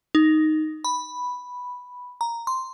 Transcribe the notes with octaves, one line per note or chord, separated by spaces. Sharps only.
D#4
B5
A#5
C6